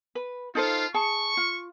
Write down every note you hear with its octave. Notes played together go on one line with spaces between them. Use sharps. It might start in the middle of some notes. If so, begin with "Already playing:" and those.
B4
D#4 F4 A4 C5
G#4 A5 C#6
F4